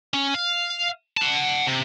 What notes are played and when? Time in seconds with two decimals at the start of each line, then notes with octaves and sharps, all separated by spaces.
0.14 C#4
0.34 F5
1.17 F#5 A5
1.67 C3